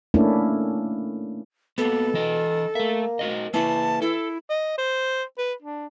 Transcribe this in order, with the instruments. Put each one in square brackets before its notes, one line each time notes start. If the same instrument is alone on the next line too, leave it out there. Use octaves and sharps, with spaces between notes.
[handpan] A3 A#3 C#4 D4 E4
[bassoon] B2 [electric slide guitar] A#3 B3 [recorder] A4
[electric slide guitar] E3 D#5
[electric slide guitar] A3 E5 [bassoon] A#3
[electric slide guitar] F#4 A#4 D#5
[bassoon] E3 [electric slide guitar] A#3 E4 [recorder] A5
[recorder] E4 [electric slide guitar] A4
[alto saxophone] D#5
C5
B4
D4